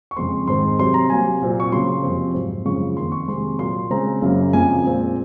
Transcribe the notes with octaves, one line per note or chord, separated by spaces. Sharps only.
C#6
F2 C#3 G#3 C4 C6
G#2 D#3 G#3 C4 C6
C3 F#3 C4 C6
A#5
C3 F#3 A#3 G#5
A#2 F#3 C4
C#6
C#3 F#3 A#3 C6
F2 C3 F3 C4
G#2 F#3 C4
F#2 C#3 F3 G#3 C#6
F2 D#3 A#3 C6
C#6
C3 D#3 G#3 C4 C6
A#2 F#3 A#3 C6
C#3 G#3 C4 A#5
F#2 C#3 F#3 A#3
F2 C#3 F3 A#3 G#5
A#2 G#3 C4